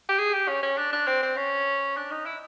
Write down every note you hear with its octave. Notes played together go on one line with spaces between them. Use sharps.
G4
G#4
G4
C#4
C#4
D4
D4
C4
C4
C#4
D4
D#4
E4